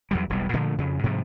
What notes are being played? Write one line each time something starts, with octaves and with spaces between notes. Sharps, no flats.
E2 F#3 G3
E1 B1 F2 G3
A#2 D3 F3 A3
F2 C#3
G#2 C3 F3 G3